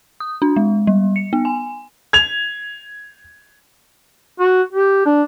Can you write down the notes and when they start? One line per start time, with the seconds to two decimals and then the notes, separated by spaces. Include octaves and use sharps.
0.20 D#6
0.42 D4
0.56 G#3
0.87 G3
1.16 C#7
1.33 B3
1.45 G#5
2.13 G#6 F7
4.40 F#4
4.73 G4
5.06 D4